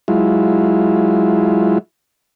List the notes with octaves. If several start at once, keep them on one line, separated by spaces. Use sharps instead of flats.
F#3 G#3 E4 F4